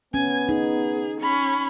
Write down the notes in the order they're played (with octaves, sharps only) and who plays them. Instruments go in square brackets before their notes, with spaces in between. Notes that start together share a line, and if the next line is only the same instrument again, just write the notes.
[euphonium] B3 [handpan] C#4 [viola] G#5
[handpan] D#4 [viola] G#4
[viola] C#4 B5